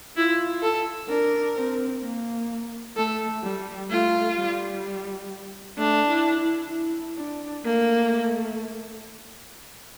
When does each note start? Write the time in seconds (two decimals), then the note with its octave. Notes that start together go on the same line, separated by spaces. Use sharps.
0.16 E4 F4
0.62 A4
1.09 D4 A#4
1.56 C4
2.03 A#3
2.97 A3 A4
3.43 G3
3.90 A3 F4
4.37 G3
5.77 A3 D4
6.08 E4
6.40 E4
6.71 E4
7.17 D4
7.65 A3 A#3